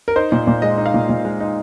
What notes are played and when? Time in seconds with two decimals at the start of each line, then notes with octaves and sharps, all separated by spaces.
0.08 A#4
0.16 D#4 C5
0.32 A#2
0.47 A#2
0.62 G#3 D#5
0.78 D#4
0.86 F5
0.94 A#2
1.09 A#2
1.25 G#3
1.40 D#4